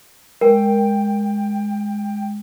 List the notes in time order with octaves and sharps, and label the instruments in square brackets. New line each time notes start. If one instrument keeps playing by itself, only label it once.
[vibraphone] G#3 [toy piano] A#4 [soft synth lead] G5